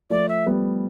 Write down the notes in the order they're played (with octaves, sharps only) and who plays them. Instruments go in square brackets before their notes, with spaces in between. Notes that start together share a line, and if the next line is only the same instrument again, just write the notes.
[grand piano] F3 A3 [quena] D5
[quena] E5
[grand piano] G3 B3